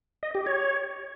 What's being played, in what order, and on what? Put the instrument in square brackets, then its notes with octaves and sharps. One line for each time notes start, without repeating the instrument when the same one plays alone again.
[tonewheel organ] D#5
G4
C#5